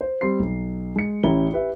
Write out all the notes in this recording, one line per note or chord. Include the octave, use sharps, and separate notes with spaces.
C5
G3 C4 C6 C7
B1
G#3 C#7
A1 C#4 E4 G4 A#5 G7
G4 B4 E5